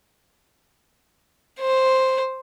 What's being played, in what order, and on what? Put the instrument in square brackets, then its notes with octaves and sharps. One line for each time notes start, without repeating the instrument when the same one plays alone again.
[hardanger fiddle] C5